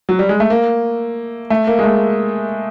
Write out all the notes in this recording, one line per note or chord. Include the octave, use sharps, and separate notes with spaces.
F#3
G3
G#3
A3
A#3
A3
A#3
G#3
A3